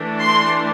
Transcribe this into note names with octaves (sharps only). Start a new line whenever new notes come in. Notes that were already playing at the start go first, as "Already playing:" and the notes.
Already playing: E3 A3 D4
C6